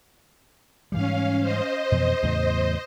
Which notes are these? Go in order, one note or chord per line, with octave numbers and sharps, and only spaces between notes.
G#2 E3 G3 C#4 F5
C5 D#5
F2 B2 E3
E2 A2 C#3